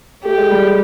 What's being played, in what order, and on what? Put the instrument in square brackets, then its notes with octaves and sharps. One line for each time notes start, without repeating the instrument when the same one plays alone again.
[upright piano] A3 [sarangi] G4
[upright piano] G#3
G3
G#3